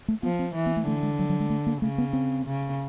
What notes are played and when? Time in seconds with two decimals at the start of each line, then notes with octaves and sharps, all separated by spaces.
0.08 A3
0.23 F3 B3
0.39 C4
0.55 E3
0.66 B3
0.77 A3
0.87 D3 A3
1.03 G#3
1.19 F#3
1.30 F#3
1.40 G#3
1.50 A3
1.67 A#3
1.82 C#3 A3
1.98 B3
2.13 C4
2.45 C#3